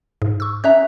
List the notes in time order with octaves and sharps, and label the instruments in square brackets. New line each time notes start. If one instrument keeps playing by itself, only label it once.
[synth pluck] G#2
C#6 E6
[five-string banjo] C#4 E5 A#5 [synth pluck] F#6